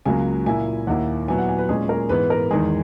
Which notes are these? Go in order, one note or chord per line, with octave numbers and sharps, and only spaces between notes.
C#2 C#3 F#3 A#3 G#5
A#2 A#3 E4 G#5
D#2 D#3 A#3 E4 F#5
A#2 F#3 B3 E4 G#5
F#5
G#5
B4
A#2 G#3 C#4 G#4
A#4
G#2 E3 G#3 B3 B4
A#4
E2 D#3 G#3 G#4